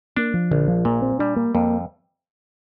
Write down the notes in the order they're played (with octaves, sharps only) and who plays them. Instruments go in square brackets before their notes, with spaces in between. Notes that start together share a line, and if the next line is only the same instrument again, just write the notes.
[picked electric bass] A#3 [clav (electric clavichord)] D4
[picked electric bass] F3
[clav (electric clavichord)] A#1 [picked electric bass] D3
[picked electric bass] F3
[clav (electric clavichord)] A#2 [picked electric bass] A#3
[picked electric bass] C4
[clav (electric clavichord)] G3 [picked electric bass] D4
[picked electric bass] A#3
[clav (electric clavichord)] F2 [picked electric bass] A#3